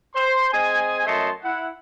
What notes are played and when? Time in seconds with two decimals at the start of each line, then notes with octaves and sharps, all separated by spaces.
0.15 C5 C6
0.53 C4 G#4 D#5 G#5
1.06 F#2 A3 C#5 D#5 A5 C6
1.44 E4 F#5